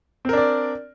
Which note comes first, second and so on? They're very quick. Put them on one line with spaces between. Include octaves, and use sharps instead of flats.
C4 A#4 D4 D5